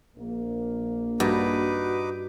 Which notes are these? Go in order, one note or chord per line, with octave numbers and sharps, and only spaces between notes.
A#1 A#3
G2 D#4 F#4 B4 D6